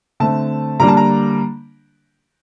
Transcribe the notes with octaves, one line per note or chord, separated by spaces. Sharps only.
D3 A3 C4 A5
D3 G3 A#3 D4 A#5
A5
A#5